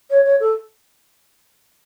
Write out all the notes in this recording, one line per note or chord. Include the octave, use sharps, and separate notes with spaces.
C#5
C#5
A4